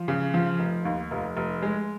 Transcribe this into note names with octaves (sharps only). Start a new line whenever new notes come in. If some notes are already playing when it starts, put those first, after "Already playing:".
Already playing: F3
C#3
F3
F1
D#2
F1
F1
G#3